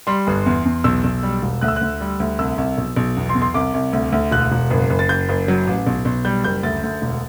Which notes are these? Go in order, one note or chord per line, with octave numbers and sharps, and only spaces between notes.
G3 C6
G1
E2
E2
B1 E6
B1
G3
E1
D2 F#6
E6
D2 F#6
G3
D2
C2 E6
C2
B1
B1
E2
C6
E2
C6
C2 D6
C2
D2
D2
E1 F#6
E1
F#1
F#1
A6
F#1 G6
F#1
F#3
A1
B1
B1
G3 G6
F#1 G6
D2 A6
D2
E1